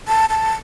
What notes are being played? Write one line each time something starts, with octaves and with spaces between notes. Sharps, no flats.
A5
A5